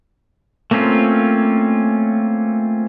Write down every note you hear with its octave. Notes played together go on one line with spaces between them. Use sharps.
A3 A#3 C4 C#4 F4